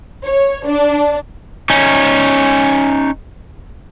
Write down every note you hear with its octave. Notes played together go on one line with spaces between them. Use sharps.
C#5
D4
C#4 D#4